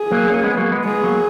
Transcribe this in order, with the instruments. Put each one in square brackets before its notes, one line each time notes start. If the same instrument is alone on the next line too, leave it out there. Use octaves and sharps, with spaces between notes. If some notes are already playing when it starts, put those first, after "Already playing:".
Already playing: [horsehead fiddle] G#4
[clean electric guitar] F#3 A#3
A#3 C#4
G#3 B3
F#3 A#3
G#3 B3
[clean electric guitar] G#3 B3 [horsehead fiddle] G#4
[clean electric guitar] F#3 A#3